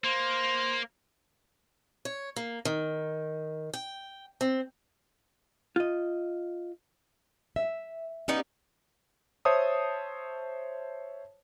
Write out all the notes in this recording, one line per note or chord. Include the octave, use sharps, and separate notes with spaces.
A#3 C5
C#5
A#3
D#3
G5
C4
F4 D#5
E5
B3 C#4 D#4 G4
C5 C#5 E5 A5 D#6